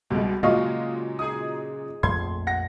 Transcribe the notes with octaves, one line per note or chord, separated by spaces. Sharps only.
C2 B2 G#3 G4
A#2 C#3 F#3 G#3 D#5 F5 C#6
D#4 G#4 D#6
A#1 F2 A3 C6 G#6
F#5 A#6